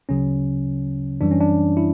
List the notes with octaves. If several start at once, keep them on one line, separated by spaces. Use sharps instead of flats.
D2 C#3 F#3 C#4
F#2 E3 G3 D4
C#4
D4
E4